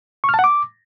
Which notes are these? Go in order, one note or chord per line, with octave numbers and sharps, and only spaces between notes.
C#6
F6
A5
F#5
D6